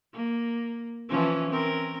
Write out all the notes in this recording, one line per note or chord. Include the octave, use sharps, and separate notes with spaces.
A#3
E3 F3 C#4
C4 C#4 A#4